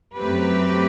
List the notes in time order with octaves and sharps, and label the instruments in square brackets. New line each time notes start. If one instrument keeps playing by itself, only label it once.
[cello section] F#2 F#3 A3 C4 G4 B4